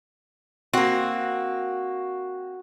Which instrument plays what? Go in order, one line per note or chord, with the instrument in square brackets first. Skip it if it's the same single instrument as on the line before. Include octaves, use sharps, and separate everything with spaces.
[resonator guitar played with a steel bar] A#3 C4 [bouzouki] F#4